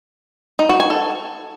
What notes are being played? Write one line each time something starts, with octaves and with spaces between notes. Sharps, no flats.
D#4
F#4
G#5
A4